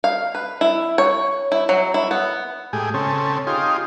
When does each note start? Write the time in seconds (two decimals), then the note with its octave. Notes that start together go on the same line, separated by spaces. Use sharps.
0.04 F5
0.35 B4
0.61 E4
0.98 C#5
1.52 E4
1.69 F#3
1.94 E4
2.11 B3
2.73 A2 G#3 G4 G#4
2.94 C#3 C4 C#4 A4
3.47 D#4 F4 G4 G#4 C6